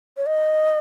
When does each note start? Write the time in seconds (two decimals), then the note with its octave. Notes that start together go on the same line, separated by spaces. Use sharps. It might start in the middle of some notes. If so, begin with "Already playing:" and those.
0.17 C#5
0.26 D#5